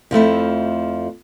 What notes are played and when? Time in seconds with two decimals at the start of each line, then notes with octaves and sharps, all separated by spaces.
0.11 F2 F3 A3 E4